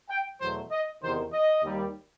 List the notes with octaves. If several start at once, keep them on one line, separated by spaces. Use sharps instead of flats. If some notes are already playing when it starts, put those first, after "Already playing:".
G5
E2 B2 F#3 A3 C5
D#5
E2 C3 D#3 C5
D#5
D#2 D#3 G3